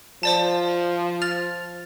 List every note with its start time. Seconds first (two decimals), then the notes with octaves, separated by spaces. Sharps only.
0.23 F3 C5 D5 A5
1.22 F6 A6 F7